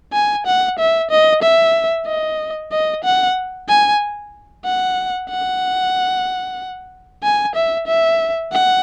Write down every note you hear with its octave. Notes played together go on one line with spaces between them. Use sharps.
G#5
F#5
E5
D#5
E5
D#5
D#5
F#5
G#5
F#5
F#5
G#5
E5
E5
F#5